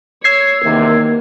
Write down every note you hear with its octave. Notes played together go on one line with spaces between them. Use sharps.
C#5 E6 G#6 C7
E2 C3 D#3 A#3